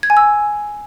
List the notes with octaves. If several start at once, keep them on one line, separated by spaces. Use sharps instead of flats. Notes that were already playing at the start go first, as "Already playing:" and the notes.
G#6
G#5
E6